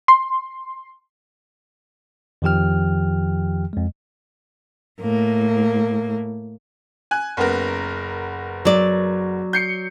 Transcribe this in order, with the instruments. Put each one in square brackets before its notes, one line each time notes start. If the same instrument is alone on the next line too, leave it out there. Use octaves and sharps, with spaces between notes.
[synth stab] C6
[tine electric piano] F2 D#3 F3 G4 G5 F6
F2 G#3
[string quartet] A2 A#3
[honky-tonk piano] G#5 F#6
F#1 B3 A#4
[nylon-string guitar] F#3 D5
[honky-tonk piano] G6 C7 C#7